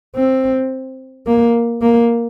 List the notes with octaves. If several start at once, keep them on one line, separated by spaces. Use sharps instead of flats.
C4
A#3
A#3